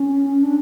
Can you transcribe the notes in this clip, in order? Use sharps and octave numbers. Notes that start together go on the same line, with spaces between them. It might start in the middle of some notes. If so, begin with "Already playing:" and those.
Already playing: C#4
D4